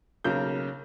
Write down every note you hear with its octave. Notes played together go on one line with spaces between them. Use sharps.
B1 C#3 A#3 A#4 G6